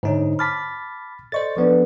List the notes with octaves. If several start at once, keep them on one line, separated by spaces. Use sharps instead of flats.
G#2 D3 D#4 C5 C#5
A5 B5 D6 F6 A6 B6
A4 C5 D5 D#5 C#6 A6
F3 B3 D4 A4 B4 D5